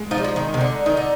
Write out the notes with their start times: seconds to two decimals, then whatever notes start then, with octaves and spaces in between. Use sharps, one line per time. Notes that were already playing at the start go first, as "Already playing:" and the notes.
Already playing: G#3
0.11 F3 D#4
0.18 G3
0.24 F3
0.36 D#3
0.48 D#4
0.54 C3
0.61 D3
0.86 D#3 D#4
0.97 D3